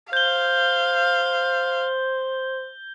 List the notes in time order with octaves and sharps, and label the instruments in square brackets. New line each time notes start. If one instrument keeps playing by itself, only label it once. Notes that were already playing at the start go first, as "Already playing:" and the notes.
[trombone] C5 [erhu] F5 [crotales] G6 G7